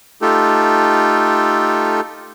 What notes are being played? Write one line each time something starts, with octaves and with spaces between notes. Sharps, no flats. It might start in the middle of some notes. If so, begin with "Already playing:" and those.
A3 D#4 F4 G4 A4